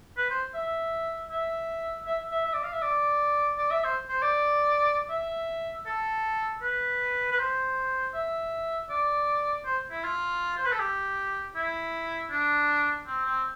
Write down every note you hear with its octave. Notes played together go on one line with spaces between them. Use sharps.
B4
C5
E5
E5
E5
E5
E5
D5
F5
E5
D5
D5
E5
C5
C5
D5
E5
A4
B4
B4
C5
E5
D5
C5
E4
F4
C5
B4
A4
G4
E4
D4
C4
C4